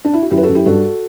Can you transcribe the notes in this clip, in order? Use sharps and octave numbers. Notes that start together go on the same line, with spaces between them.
D4
E4
F#4
F#2 E4 G4
B4
F#4 A4
F#2
E4 G4
G2 F#4 A4